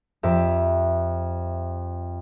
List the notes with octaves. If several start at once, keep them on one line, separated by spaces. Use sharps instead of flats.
F2 G4 E5 A#5